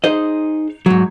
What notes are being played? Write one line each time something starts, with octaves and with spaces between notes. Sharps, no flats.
D#4 G#4 C5 D#5
G#2 F#3